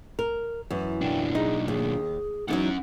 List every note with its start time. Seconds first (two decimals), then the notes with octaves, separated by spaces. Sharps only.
0.19 A#4
0.70 F#2 E3
1.01 B1 D4 G5
1.35 D#4 G#4
1.68 D#2 G#4
2.48 E2 D#3 F#3 C#4 D#4 F#5